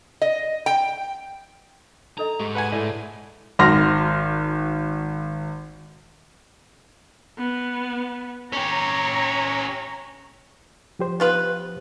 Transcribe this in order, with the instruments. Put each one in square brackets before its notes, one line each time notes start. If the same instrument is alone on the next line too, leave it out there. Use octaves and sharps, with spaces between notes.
[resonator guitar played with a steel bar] D#5
G5
[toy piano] D4 A4 D#5 [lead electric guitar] A#5
[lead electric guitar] G#2 [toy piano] G4 C6 C#6
[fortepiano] B4 F#5 G#5
[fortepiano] A2 [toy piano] D5
[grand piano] G#1 F#4 C6 F6 A#6
[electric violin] B3
[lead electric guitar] C#4 G4 [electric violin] C#5 A#5
[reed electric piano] F3 G4 C5
[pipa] B3 F4 B4